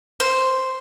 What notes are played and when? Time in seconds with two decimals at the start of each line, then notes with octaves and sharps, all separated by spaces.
0.20 C5